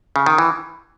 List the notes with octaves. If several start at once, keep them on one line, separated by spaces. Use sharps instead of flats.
C#3
D#3
E3